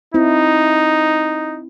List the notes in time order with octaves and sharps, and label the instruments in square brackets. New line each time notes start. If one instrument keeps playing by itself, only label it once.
[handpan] C4 E4 [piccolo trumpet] D#4